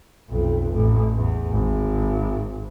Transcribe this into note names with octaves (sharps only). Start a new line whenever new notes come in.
B1 F2
A1
E2
G#1